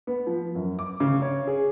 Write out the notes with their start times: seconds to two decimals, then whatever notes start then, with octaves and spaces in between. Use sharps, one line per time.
0.07 B3
0.27 F3
0.55 F#2
0.79 D6
1.00 C#3
1.22 C#5
1.47 G#4